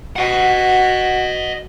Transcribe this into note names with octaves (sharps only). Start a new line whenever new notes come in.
F#4 D#5 F#5